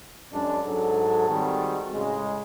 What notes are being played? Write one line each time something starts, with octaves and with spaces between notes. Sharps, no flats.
F#2 G#3 D4
G#2 F#3 A4
D#3 G3 G#3 C4 F#4
A2 C#3 G#3